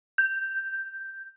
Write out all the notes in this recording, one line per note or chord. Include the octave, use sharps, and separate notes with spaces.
G6